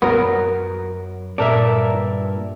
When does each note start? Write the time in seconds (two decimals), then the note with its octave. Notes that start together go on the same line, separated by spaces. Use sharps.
0.02 F#2 F#3 B3 A#4
1.38 G2 A#2 A4 A#4 D5 E5